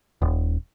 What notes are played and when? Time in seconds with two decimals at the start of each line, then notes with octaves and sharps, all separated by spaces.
0.22 D#1